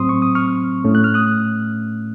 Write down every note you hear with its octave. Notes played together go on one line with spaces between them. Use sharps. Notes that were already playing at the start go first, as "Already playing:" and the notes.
Already playing: A2 F#3 C4 C6 D#6
C#6
D#6
C#6 F6
A2 A3 C#4
F#6
F6
D#6 F#6